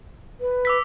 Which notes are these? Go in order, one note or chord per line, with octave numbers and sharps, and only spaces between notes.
B4
D6 E6 B6